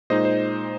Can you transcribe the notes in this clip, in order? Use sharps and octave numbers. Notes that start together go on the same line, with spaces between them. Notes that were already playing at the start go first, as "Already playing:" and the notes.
A#2 G#3 D#4 C5 D#5
C5